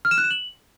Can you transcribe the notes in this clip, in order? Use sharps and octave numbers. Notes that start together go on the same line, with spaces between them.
F6
E7
F#6
E7
F#7